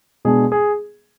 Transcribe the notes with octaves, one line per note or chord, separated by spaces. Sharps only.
B2 G#3 B3 D4 G#4
G#4